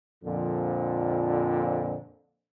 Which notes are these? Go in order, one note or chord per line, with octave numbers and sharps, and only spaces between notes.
F2 A#2 D3 F3